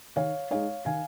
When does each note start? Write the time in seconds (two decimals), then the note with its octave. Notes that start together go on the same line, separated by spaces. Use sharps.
0.16 D#3 C#5 F5
0.51 G#3 D#4 C#5 F5
0.85 D#3 F5 G#5